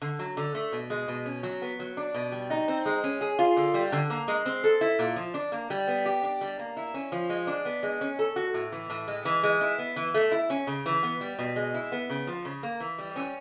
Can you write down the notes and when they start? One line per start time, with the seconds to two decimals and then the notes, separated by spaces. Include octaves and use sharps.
0.02 D3
0.19 F#3
0.37 D3
0.55 A3
0.72 B2
0.90 G#3
1.08 B2
1.26 C#4
1.43 F#3
1.62 B3
1.80 F#3
1.97 D4
2.14 B2
2.32 G3
2.50 D#4
2.68 C4
2.86 G#3
3.04 C#4
3.21 G#4
3.39 F4
3.57 D3
3.74 G3
3.92 D3
4.10 A#3
4.28 G#3
4.46 C4
4.64 A4
4.81 E4
4.99 A#2
5.16 F3
5.34 D4
5.52 A#3
5.70 G3
5.88 B3
6.06 G4
6.23 D4
6.41 G3
6.59 A#3
6.77 E4
6.94 C#4
7.12 F3
7.29 G#3
7.47 D4
7.65 B3
7.83 G#3
8.01 C#4
8.19 A4
8.36 F#4
8.54 A2
8.72 E3
8.90 A2
9.08 G#3
9.25 E3
9.43 G#3
9.61 E4
9.78 B3
9.96 E3
10.14 A3
10.32 E4
10.50 C#4
10.67 C#3
10.86 E3
11.03 B3
11.21 G3
11.39 B2
11.56 G#3
11.74 E4
11.92 B3
12.10 C#3
12.27 F3
12.45 C#3
12.63 A#3
12.80 E3
12.98 G3
13.16 C#4